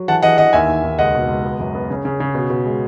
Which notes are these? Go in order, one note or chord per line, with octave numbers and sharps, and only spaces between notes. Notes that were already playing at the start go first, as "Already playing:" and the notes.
Already playing: F#3
E3 F#5 A5
E3 D#5 F#5
E3 D#5 F#5
D#2 E5 G#5
D#2
D#2
C#2 D#5 F#5
B2
C#2
B3
F#2
B3
C#3
C#3
C#3
B2
B2
G#3